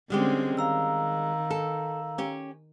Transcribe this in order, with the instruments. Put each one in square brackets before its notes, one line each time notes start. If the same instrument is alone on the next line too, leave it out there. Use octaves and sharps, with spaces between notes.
[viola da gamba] D3 C4 C#4 [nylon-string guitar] G3 G#3 G4
[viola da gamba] D#3 [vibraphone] F5 A#5 E6
[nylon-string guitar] A4
C#4 G4